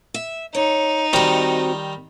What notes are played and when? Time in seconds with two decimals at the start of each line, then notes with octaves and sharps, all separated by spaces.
0.14 E5
0.55 D#4 C#5
1.13 D#3 G3 C4 F#4 A#5